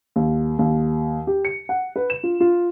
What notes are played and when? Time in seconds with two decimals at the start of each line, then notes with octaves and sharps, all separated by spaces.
0.16 D#2
0.59 D#2
1.27 G4
1.45 C#7
1.69 F#5
1.96 B4
2.10 E7
2.23 F4
2.40 F4